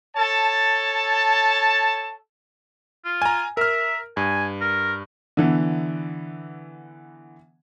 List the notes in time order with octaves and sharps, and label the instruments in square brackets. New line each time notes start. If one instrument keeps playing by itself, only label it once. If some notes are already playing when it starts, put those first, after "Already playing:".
[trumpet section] A4 C#5 A5
[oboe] F4
[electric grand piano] G#5 A#5
[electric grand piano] A#4 F6 [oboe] E5
[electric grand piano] G2 [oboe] G#5
[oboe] A#4
[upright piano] D3 E3 B3